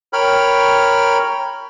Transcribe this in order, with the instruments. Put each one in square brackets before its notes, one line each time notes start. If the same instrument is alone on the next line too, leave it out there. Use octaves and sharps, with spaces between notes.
[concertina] A#4 C#5 G5 B5 F6